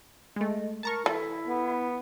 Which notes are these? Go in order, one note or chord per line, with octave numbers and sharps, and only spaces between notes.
G#3 A3 D#5
A#4 A5 A#5 C#6
E3 E4 A4
B3